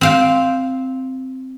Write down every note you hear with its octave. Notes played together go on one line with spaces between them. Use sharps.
C4 F5 G5